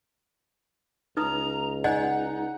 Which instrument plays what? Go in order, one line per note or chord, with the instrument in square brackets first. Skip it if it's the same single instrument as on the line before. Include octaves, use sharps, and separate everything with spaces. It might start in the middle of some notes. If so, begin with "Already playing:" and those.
[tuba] C#2 [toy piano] D#4 B4 D#6 [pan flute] A#5
[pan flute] D#4 [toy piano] D5 D#5 G#5 [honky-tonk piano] F#5